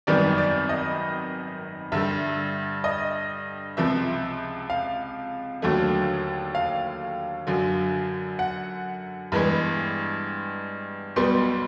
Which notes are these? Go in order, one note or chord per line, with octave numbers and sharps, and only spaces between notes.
G#1 F#2 D#3 G3 B3 D5
D5
D#5
G2 D3 G3 E5
D#5
C#2 C3 F3 E5
F5
D#2 D3 F#3 A3
F5
F#2 D3 F#3
F#5
G2 E3 G#3 B3 B5
B1 B2 G3 B3 C6